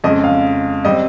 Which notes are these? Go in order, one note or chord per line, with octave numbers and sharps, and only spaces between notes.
F2 C#3 G#3 C#4 D#5
F5
G3 C4 D#5